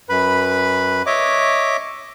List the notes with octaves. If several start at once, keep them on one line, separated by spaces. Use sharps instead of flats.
F#2 B4 B5
C#5 D#5 E5 D6